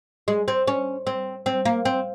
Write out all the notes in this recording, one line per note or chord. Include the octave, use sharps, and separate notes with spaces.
G#3
C4
C#4
C4
C4
A#3
C4